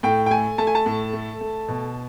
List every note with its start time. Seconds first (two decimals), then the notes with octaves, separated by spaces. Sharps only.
0.03 A2 G5
0.26 G5
0.30 A3 G#5
0.58 A3 A5
0.67 G#5
0.75 A5
0.86 A2
1.13 A3
1.41 A3
1.68 B2